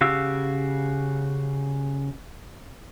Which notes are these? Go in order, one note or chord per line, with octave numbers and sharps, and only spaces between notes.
C#3 F#4 G4 F5 E6